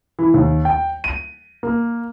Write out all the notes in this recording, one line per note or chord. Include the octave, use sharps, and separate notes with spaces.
E3
D#2
G5
D#7
A#3